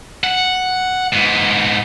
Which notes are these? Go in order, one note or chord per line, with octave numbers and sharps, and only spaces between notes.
F#5
G#2 B3